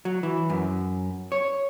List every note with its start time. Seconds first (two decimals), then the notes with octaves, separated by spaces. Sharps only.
0.05 F#3
0.23 E3
0.50 F#2
1.32 C#5